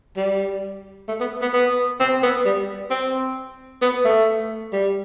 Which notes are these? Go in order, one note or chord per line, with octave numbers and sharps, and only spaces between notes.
G3
A3
B3
B3
B3
C4
B3
G3
C4
B3
A3
G3